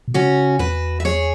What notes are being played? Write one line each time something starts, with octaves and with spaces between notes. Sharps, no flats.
B2
C#3 C#4 F#4
E2 F#4 B4
E5
G#4 C#5